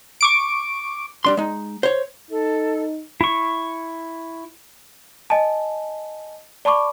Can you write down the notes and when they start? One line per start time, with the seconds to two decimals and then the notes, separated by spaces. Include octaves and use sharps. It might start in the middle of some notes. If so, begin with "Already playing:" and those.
0.21 C#6 D6 D7
1.25 G3 D4 C6
1.37 G#3 D#4
1.83 C5 C#5
2.31 D#4 A4
3.21 E4 C#6
5.30 D#5 G#5 A5
6.65 D5 A5 B5 C#6 D6